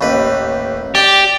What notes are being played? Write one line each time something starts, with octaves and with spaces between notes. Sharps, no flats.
A1 D#2 B4
G4 D5 G5